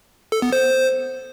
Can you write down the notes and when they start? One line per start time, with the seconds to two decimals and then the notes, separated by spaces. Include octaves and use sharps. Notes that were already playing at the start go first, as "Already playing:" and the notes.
0.32 A4
0.42 B3
0.53 C5